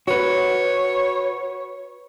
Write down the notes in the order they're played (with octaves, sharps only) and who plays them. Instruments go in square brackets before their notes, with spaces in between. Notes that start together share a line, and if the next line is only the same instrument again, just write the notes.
[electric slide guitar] F#4 B4 [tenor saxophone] C#5